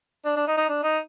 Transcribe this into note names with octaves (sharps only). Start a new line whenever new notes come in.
D4
D4
D#4
D#4
D4
D#4